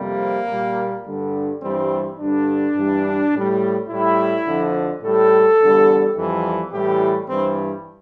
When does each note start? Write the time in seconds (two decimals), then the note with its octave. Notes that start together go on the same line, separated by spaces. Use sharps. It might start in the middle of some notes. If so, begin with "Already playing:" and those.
Already playing: F2 C3 G3 A#3
0.50 A#2 G3
1.06 G2 D3 G3
1.63 G2 E3 G3 C4
2.20 G2 D3 G3 D4
2.76 G2 E3 G3
3.33 A2 G3
3.89 A2 G3 E4
4.46 F2 D3 F3
5.02 A2 G3 A4
5.60 E2 D3 G3
6.17 F2 E3 G3
6.72 A2 E3 G3 G4
7.29 G2 E3 G3 C4